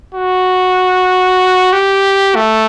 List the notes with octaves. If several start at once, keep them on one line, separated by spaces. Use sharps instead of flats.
F#4
G4
A3